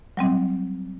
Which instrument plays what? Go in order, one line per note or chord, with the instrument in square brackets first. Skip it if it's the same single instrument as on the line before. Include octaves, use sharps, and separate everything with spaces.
[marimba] F#3 G3 C4